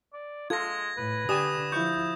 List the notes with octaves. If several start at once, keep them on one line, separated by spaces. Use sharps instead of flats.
D5
G#3 F4 A4 G#6 A#6
A2 B4
D3 G4 D5 G#5 D#6 E7
F3 E4 C#6 G6